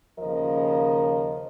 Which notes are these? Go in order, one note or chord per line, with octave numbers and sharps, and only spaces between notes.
D#2 C#3 F3 A#4 D#5